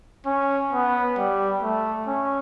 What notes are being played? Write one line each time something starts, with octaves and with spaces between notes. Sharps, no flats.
C#4
B3
G3
A3
C#4